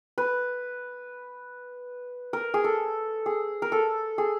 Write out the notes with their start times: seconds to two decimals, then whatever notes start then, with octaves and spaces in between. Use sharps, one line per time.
0.18 B4
2.33 A#4
2.54 G#4
2.64 A4
3.26 G#4
3.62 A#4
3.72 A4
4.18 G#4